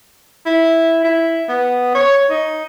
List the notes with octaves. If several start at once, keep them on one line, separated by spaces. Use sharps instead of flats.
E4
E4
B3
C#5
D#4